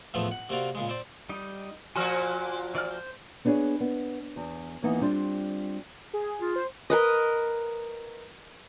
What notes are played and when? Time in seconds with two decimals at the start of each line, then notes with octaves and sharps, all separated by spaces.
0.14 E2 A2 F3 A3 B3 C4
0.31 F#5
0.49 C3 A#3 C4 F#4 D5 F5
0.75 A#2 C#3 G#3
0.89 C4 C5 D5
1.29 G3 D#4
1.96 A#2 F3 F#4 G#5 C6 F6
2.75 E3 D5 F6
2.91 C5
3.45 B3 D4 E4 G#4 C#5
3.80 B3
4.36 E2
4.82 D#2 E3 A#3 B3 D#4 F#5
5.02 G3 C4 D4 F4 G4
6.14 G#4
6.40 F4
6.56 C5
6.90 A#4 B4 D#5